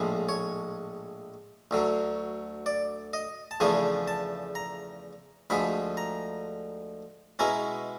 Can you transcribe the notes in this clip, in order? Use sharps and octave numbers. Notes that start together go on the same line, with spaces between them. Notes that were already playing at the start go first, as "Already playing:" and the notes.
Already playing: A#1 A2 F3 G#3
C#5
D2 D3 F#3
D5
D#5
A5
E2 C#3 F3 A3 D4 G#5
A5
A#5
D2 D3 F3 G#3 B5
A#5
B2 G#3 C#4 E4 A#5